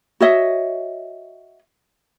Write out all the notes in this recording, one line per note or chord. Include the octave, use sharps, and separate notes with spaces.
F#4 C#5 D#5 E5